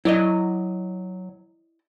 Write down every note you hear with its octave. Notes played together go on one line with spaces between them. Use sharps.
F#3 E4 D5 D#5